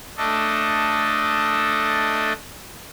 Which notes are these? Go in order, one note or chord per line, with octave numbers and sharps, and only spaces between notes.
A3 D4 A4 D#5